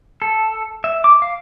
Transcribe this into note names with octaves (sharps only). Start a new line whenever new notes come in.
A4
E5
D6
F5